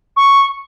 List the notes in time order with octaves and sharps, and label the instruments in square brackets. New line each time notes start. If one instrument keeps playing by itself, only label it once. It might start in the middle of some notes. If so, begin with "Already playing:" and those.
[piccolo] C#6